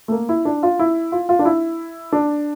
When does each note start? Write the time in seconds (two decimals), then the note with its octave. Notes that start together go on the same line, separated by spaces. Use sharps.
0.08 A3
0.12 A#3
0.29 E4
0.45 D4
0.63 F4
0.79 E4
1.12 F4
1.29 F4
1.39 D4
1.45 E4
2.12 D4